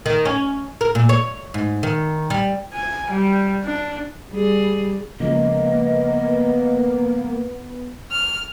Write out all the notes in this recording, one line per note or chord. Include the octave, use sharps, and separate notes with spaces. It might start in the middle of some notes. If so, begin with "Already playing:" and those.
D#3
C#4
A#4
A#2
C#5
G#2
D#3
G3
G#5
G3
D4
G3 G#4
C#3 F3 G#3 A#3 B3 D#5
F6